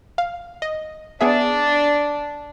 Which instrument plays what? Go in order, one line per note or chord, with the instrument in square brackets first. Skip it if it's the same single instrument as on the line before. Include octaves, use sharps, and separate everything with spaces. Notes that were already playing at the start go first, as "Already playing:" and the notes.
[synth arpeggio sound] F5
D#5
[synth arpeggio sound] B3 G#4 E5 [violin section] D4